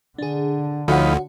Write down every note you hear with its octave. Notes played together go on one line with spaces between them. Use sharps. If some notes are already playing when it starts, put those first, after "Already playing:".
D3 D4 G#4
D2 F3 D#4 F#4 C#5 F#5 B5